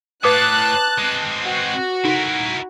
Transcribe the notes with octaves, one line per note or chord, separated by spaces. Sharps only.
A2 B4 A5 D6 D#6 F#6
G#3 C4
F#4
D#4 E4 A#4